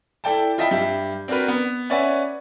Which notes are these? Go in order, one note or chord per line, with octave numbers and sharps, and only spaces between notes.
E4 A4 D5 G5 A5
F4 D#5 E5 G5 A5 B5
G2 G4 E5
C4 D4 F#4 A#4 B4
B3
C#4 B4 D5 E5 F#5 G#5